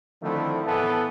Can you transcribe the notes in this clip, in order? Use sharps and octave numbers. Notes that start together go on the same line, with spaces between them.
D3 D#3 F3 A3 C4 E4
A2 E3 B3 A4